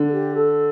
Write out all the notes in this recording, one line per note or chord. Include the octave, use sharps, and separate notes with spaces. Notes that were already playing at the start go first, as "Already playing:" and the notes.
Already playing: D3
A4
G4
A4